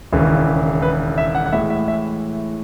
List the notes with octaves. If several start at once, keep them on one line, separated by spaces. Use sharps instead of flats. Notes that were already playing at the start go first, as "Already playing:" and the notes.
E1 D#2 C#3 E3
B4
E5
F#5
F#5
A2 E3 G#3 E5
E5
E5